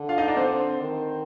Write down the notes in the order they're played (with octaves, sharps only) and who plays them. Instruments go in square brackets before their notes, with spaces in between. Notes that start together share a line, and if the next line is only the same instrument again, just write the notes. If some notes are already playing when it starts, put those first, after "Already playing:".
Already playing: [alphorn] D3
[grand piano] F4 F5
D#4 D#5
D4 D5
C4 C5
[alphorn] D#3